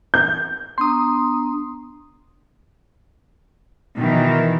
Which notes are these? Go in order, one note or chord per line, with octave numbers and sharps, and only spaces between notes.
G6
B3 D4 A#5 C6 D#6
B2 D#3 E3